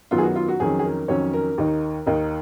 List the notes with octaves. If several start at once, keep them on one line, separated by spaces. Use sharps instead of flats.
F#2 D#3 F#3 B3 F4
G#4
F#4
F4
F#4
F2 D#3 F#3 C#4 G#4
G#4
A#4
F2 D#3 F#3 C#4 C#5
A#4
D#2 D#3 A#3 D#4
D#2 D#3 A#3 D#4